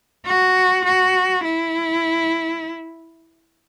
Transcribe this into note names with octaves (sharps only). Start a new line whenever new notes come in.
F#4
F#4
E4